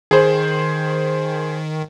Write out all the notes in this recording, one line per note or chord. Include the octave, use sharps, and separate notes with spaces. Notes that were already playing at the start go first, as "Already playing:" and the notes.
D#3 G#4 C5